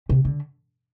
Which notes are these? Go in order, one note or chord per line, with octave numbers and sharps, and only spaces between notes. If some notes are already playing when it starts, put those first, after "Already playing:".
C3
D3